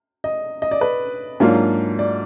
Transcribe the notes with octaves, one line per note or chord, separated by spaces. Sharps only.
D#5
D#5
D5
B4
G#2 F#3 A#3 D4 F4
D5